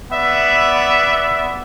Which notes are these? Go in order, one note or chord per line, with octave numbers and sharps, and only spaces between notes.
B3 D5 E5